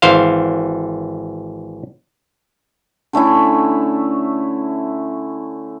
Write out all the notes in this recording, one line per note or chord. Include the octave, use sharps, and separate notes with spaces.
G#1 E3 C5 F5
D3 A3 C#4 E4